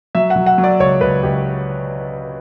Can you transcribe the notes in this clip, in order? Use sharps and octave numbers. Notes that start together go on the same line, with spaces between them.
F#3 E5
F#5
F#3
F#5
F#3
D5
C#2 C#5
C#2 B4
C#2 G4